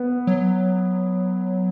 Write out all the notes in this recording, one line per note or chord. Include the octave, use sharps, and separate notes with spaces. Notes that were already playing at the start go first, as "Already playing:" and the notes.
Already playing: B3
F#3